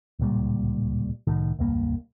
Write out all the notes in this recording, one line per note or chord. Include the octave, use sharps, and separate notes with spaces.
D1 C#2 A#2 G3
C2 A2 D#3
E1 C#2 G2 A#3